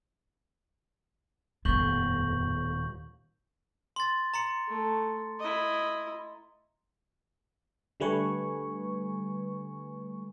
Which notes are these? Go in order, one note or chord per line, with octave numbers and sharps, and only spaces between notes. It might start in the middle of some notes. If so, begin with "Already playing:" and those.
D#1 F2 A2 B3 C#6 G6 F#7
C6 A6
A#5 C6 C#7
A3
E4 D#5
D3 G3 A3 B4 G#5 C#6